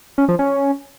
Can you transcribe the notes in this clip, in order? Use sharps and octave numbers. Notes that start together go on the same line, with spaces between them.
C#4
F3
C#4